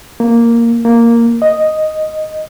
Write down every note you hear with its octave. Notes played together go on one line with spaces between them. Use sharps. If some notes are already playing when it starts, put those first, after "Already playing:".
A#3
A#3
D#5